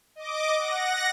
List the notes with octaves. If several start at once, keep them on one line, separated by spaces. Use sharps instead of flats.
D#5 D6
F#5 A#6